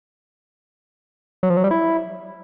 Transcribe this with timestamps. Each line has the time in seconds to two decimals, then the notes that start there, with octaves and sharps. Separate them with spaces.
1.43 F#3
1.50 F3
1.57 F#3
1.64 G3
1.71 E4